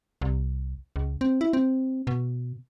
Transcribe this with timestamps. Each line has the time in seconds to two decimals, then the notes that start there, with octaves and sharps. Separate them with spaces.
0.21 C2
0.96 C#2
1.21 C4
1.41 E4
1.53 C4
2.07 B2